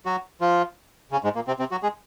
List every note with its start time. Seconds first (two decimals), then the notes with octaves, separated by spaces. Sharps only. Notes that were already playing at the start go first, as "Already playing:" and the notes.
0.06 F#3 F#4
0.41 F3 F4
1.12 C#3 C#4
1.24 G#2 G#3
1.35 A#2 A#3
1.47 C3 C4
1.59 C3 C4
1.71 F#3 F#4
1.83 G#3 G#4